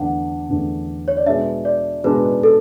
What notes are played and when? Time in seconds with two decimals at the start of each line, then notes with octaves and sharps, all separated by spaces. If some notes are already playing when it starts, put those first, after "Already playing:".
Already playing: E2 D3 A3 D4 F#5
0.49 E2 D3 A3 D4
1.08 C#5
1.17 D5
1.26 B2 G#3 B3 D4 E5
1.65 D5
2.04 B2 G#3 B3 D4 B4
2.43 A4